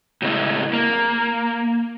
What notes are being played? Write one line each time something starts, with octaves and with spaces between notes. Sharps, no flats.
A2 C#3 G#3 C4 E4
A#3